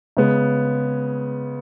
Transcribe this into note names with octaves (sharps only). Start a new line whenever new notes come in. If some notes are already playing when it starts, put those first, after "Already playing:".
C#3 G#3 B3